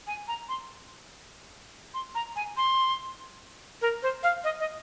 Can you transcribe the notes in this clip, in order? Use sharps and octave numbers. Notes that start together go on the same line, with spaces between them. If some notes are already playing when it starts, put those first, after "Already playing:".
G#5
A#5
C6
C6
A#5
G#5
C6
A#4
C5
F5
D#5
D#5